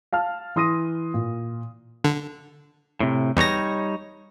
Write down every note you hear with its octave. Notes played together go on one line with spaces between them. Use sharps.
F5 A5 F6
E3 C6 D#6 A#6 D#7
A#2
D3
A2 C3
E2 G3 D#4 C#5 A#6